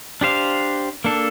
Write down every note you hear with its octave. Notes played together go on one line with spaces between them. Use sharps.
D4 G4 C5 F5
A#3 D4 A4